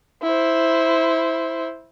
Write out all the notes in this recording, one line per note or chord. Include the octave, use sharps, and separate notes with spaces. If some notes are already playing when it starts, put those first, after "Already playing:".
E4 C5